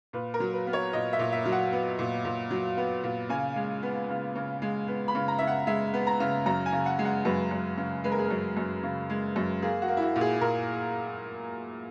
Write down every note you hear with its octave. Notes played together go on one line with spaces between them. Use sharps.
A#2 B4
A#4
F#3
B4
B3
C#5
A#2 D#5
E5
A#2
E5
F#3
F#5
B3
A#2
A#2
F#3
B3
A#2
C#3 G#5
G#3
B3
C#3
C#3
G#3
B3
B5
C#3
A#5
C#3 E5
F#5
G#3 E5
B3
A#5
C#3
F#2 A#5
G#5
C#3
F#5
G#3
F#5
F#2 B4
F#2
C#3
G#3 B4
A#4
G#4
F#2 A#4
F#2
C#3
G#3
F#2
A#3 G#4
F#4
A#3
E4
F#4
A#2
G#4
A#2 A#4